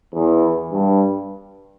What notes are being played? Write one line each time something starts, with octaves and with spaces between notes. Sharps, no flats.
E2
G2